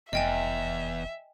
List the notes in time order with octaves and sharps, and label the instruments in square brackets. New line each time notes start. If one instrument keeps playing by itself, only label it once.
[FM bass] F1 [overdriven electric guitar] E2 [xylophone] D#5 G5 G#5 [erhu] E5